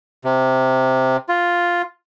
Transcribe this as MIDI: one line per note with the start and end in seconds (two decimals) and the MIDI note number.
0.25 1.17 48
1.29 1.82 65